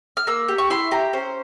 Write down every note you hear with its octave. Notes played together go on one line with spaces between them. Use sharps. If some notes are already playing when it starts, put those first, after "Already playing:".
F6
A#3 E6
G4
C#6
E4 C6
G4 A#5
C#4 C5